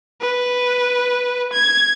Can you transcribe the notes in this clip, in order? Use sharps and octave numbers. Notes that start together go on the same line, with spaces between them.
B4
G#6